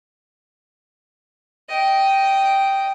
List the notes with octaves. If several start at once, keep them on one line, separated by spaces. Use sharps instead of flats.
D#5 G5